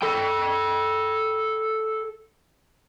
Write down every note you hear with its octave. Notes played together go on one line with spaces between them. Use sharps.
A4 G5